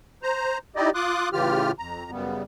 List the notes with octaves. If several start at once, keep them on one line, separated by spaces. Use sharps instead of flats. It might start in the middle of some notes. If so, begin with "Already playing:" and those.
C5 A#5
D#4 E4 G4 D5 D#5
F4 C6 D6 D#6 F#6
A2 C#3 E3 F4 G4 F6
F2 A#5
F#2 C#3 G3 B3